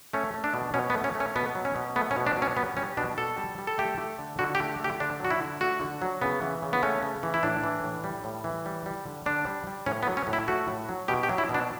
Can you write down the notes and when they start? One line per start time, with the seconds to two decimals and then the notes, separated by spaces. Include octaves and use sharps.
0.13 A3 C#4
0.34 A3
0.44 D4
0.54 B2
0.74 B2 C#4
0.90 B3
0.94 A3
1.04 C#4
1.15 A3
1.20 C#4
1.35 B2 B3
1.55 F#3
1.65 C#4
1.76 B2
1.96 A3 B3
2.11 C#4
2.17 B2
2.27 D4
2.36 F#3
2.42 C#4
2.57 G3 B3
2.77 G3 C#4
2.97 B2 D4
3.18 B2 A4
3.38 G3
3.58 G3
3.67 A4
3.78 A3 G4
3.98 A3
4.19 D3
4.39 D3 F#4
4.55 G4
4.60 A3
4.80 A3 G4
5.00 D3 D4
5.20 F#3 F#4
5.31 E4
5.41 D3
5.61 A3 F#4
5.81 D3
6.02 F#3
6.21 C#3 B3
6.42 E3
6.62 C#3
6.73 B3
6.83 A3 C#4
7.03 C#3
7.23 E3
7.34 E4
7.43 A2 D4
7.64 E3
7.83 A2
8.04 G3
8.24 A2
8.44 E3
8.66 G3
8.86 G3
9.06 D3
9.26 D3 D4
9.47 G3
9.67 G3
9.86 A2 C#4
10.03 B3
10.07 F#3
10.17 C#4
10.27 A2
10.33 E4
10.48 A3 F#4
10.68 A2
10.89 F#3
11.08 B2 G4
11.23 G4
11.29 F#3
11.38 E4
11.49 B2
11.55 D4